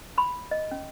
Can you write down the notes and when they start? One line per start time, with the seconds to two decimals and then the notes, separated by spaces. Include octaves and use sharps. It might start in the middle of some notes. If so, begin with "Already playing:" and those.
0.18 B5 C6
0.51 D#5
0.71 C#4